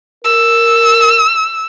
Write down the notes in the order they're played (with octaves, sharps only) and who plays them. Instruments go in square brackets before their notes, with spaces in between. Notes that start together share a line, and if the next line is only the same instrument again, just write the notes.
[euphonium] A#4 [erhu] E6